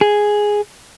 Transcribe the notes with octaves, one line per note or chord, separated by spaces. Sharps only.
G#4